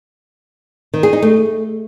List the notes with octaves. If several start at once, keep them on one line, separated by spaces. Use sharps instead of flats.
D#3
G#4
D#4
A3